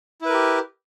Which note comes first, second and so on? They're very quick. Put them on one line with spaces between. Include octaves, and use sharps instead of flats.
E4 B4 A#4 G4